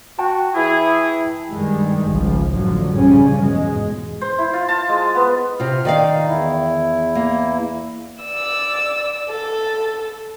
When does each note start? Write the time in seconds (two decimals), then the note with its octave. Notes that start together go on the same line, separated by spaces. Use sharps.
0.19 F#4 G5 A5
0.55 E3 E4 G#4
1.49 G2 D#3 G3 G#3
2.10 G#1 C#2 F3
2.50 A1 F#2 D3 F3 F#3
2.94 A#1 G2 C#3 F3 G3 C#4
3.40 E2 G#2 B2 G#3
4.21 C5
4.38 E4
4.54 F4
4.68 A5
4.89 G#3
5.15 B3
5.60 C3 F4 F6
5.85 D#3 D#4 D5 F5
6.28 E2 E4
7.15 A#3
8.23 D5 E6
9.30 A4